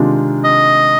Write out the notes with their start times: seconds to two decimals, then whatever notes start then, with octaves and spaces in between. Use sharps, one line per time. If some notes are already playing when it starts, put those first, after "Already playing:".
Already playing: C3 D#3 G#3 D4 F4
0.44 D#5